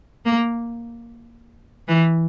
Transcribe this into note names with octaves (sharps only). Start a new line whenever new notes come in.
A#3
E3